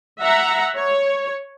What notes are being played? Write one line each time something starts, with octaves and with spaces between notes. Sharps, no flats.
E5 F#5 A#5
C#5